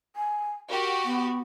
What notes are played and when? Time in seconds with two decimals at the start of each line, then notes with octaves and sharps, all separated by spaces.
0.16 G#5
0.70 F#4 G4 A#4
1.05 B3